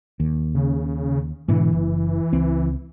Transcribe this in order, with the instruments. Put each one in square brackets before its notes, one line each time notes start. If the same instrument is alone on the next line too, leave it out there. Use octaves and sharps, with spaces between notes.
[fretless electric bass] D#2
[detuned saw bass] C#3
[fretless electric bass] G#2 B2 D3 [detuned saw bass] E3
[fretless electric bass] F#1
C#2 C4